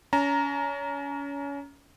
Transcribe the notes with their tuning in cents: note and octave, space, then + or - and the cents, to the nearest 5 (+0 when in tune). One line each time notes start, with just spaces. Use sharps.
C#4 +30 A#5 +0